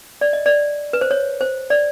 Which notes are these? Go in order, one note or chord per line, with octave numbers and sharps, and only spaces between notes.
D5
D#5
D5
B4
C5
C#5
C5
D5